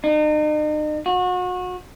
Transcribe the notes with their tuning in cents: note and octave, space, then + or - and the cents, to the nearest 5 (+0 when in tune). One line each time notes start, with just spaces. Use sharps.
D#4 -40
F#4 -30